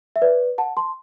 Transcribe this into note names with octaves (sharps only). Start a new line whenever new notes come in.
E5
B4 D5
F#5 A5
A5 C6